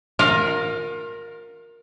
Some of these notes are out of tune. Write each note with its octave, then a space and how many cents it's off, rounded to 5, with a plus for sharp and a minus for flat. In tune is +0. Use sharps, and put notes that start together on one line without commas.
F4 +35 A#4 +0